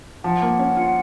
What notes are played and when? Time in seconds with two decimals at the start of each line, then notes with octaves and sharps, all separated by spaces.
0.24 F3 F#5
0.42 A#3
0.59 C#4
0.77 F4